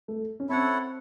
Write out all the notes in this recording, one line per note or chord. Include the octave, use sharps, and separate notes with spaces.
A3
C#4
C4 E4 A4 C#5 F#5